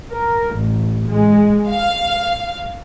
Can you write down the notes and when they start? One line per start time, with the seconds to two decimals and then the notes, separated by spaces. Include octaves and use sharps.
0.11 A#4
0.56 A1
1.08 G#3
1.70 F5